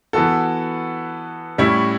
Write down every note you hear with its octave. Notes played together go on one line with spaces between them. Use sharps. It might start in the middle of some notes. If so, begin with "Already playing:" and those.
E3 B3 F#4 A4
A2 G3 C#4 E4